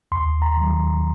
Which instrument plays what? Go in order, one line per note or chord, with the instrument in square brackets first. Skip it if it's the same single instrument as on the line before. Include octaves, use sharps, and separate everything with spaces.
[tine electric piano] D#2 C6
A#5
D#3 F#3